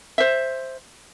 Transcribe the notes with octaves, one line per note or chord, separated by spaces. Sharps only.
C5 E5